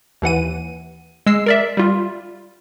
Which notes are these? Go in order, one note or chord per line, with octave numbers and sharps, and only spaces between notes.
D#2 E3 F#5 D#7
G#3 E6 C7
A#4 D5 E5
G3 F4